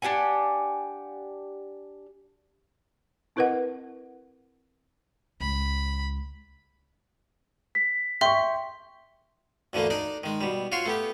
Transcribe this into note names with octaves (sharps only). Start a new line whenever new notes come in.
D4 G4 F#5 G#5
C4 E4 A#4 B4 D#5 F#5
C#2 B5
B6
E5 G5 C6 C#6
D2 D3 E3 A3 A#3
D4 D#4 D5
D#3 G#3
B2 G3
F4 F#4 C#5 C6
A3 B3 G4